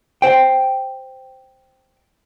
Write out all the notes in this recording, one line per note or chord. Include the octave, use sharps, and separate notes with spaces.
C5 G5